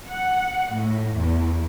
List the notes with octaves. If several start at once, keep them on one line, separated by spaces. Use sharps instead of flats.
F#5
A2
E2